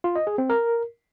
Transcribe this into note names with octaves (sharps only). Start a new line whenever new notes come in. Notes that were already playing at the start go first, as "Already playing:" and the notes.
F4
D#5
G#4
C4
A#4